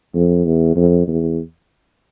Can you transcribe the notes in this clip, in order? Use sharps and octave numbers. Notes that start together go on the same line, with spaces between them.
F2
E2
F2
E2